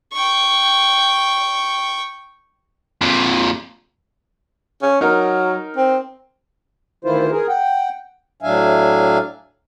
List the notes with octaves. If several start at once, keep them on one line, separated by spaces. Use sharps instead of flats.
G5 C#6
F2 A#2
C#4
F#3 D#4 A#4
C4
D2 D#3 E3 E4 F4 C5
G#4 A#4
F#5 G5
A2 F#3 D4 E5 F5 G#5